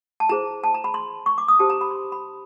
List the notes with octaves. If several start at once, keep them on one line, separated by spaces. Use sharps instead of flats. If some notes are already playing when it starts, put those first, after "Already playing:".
A5
E4 G#4 C5 A#5
A5
A#5
B5
C6
C#6
D6
D#6
D4 G4 C5 A5
A#5
B5
C6
B5